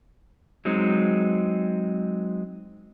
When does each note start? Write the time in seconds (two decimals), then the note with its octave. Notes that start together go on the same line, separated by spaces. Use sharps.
0.65 F#3 G#3 C4 D#4